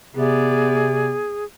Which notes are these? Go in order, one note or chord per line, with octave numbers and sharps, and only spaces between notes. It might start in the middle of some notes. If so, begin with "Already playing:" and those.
C3 B3 G#4 D5